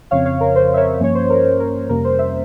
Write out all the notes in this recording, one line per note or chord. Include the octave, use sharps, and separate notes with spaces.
F2 C#3 F3 C4 C#5 F5
C#5 F5
A#4
C5
E5
A#4 C#5
G2 F3 A#3 C#4 C#5
C5
A#4
A#4
F2 C3 G3 A#3 C#4 A#4
C5
C5 E5